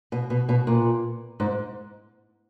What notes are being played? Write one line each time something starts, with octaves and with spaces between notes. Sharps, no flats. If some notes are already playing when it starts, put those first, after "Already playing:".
B2
B2
B2
A#2
G#2